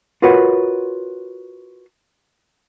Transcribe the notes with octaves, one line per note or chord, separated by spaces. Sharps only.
F4 F#4 A#4 B4 C#5 F#5